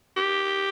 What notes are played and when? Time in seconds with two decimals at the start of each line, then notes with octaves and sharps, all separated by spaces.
0.17 G4